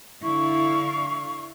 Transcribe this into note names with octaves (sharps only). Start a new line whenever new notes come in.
D3 E4 F5 C#6